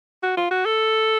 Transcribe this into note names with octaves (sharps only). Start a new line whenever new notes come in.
F#4
F4
F#4
A4